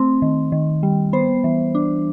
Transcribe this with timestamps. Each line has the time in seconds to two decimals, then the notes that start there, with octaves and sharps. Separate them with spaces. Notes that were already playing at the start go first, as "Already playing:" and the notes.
Already playing: A3 C4
0.22 D#3
0.52 D#3
0.83 G3
1.13 B3 C5
1.44 E3
1.75 D4